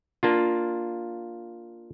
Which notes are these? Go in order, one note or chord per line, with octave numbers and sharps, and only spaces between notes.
A#3 D4 F4